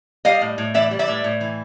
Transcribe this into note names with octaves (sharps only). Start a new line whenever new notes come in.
G3 D#5 F5
A2
A2
E3 D5 E5
G3
D5 E5
A2
A2
E3